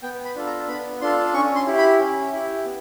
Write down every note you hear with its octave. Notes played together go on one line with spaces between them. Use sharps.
B3 G5
B5
D4 F4 A4
A#5
B3 B5
D4 F4 A4 C6
C#4 C#6
C6
E4 G4
B5
C#4
E4 G4
B3